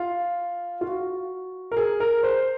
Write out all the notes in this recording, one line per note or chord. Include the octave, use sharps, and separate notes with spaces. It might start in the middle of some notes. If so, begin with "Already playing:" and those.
Already playing: F4
F4
F#4
A#4
G#4
A#4
C5